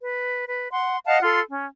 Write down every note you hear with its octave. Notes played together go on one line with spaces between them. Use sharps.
B4
B4
F#5 C6
D#5 F5 F#5 A5
F4 A4 C6
C#4